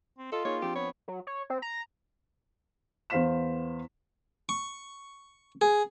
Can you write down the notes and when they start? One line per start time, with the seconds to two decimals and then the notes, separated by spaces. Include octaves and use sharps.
0.18 C4
0.32 F4 A4 D#5
0.45 A#3 D#4 G#4 C#5
0.62 F3 C4 D4 G4
0.75 B3 C#5
1.08 F#3
1.27 C#5
1.50 C4
1.62 A#5
3.10 E2 B3 C5 F5 B6 E7
4.49 C#6
5.61 G#4